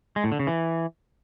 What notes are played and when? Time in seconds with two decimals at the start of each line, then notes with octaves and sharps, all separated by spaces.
0.16 G#3
0.24 A2
0.32 D3
0.39 C#3
0.47 E3